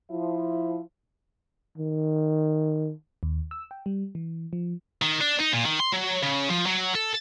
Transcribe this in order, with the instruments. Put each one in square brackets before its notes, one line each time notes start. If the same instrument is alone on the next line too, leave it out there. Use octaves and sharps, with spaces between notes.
[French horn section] F3 E4
[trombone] D#3
[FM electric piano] D#2
E6
G5
G3
E3
F3
[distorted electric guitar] D#3
D4
D#4
A#2
D#3
C6
F#3
C#3
F3
F#3
A4